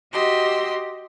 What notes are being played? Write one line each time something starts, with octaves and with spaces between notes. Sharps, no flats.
F#4 G4 D#5 C6 E6